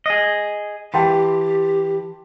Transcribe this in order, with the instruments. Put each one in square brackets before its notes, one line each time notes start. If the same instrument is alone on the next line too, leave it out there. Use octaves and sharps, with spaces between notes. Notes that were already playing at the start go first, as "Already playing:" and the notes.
[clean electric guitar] G#4 D#5
[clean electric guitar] E3 [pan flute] G4 [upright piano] G5 A5 C6